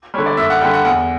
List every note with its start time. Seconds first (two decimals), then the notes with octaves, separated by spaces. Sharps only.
0.14 G3 C#5
0.18 D3
0.26 D5
0.37 F#2 E5
0.50 F#5
0.61 D3 G3 G5
0.73 F#5
0.85 E2 F#5